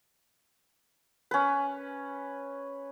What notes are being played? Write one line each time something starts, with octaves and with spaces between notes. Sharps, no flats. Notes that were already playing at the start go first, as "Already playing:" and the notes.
C#4 B4